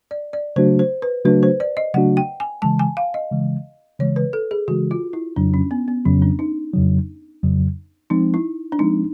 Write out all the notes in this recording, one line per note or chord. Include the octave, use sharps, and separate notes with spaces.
D5
D5
C#3 F#3 A3 D4 F#4 C5
C5
B4
C#3 F#3 A3 D4 F#4 B4
C5
D5
D#5
C#3 F#3 A3 D4 F#4 F#5
G5
G#5
C#3 E3 G#3 A5
G#5
F5
D#5
C#3 E3 G#3
C#3 E3 G#3 C#5
B4
A4
G#4
C#3 E3 G#3 F#4
F4
E4
F2 C#3 F#3 D4
C#4
B3
B3
F2 C#3 F#3 C#4
D4
D#4
F2 C#3 F#3
F2 C#3 F#3
F3 G#3 C4 D#4
E4
D4
F3 G#3 C4 D#4